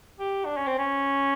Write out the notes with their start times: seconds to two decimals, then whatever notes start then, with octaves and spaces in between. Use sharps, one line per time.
0.20 G4
0.45 D4
0.57 C#4
0.67 C4
0.79 C#4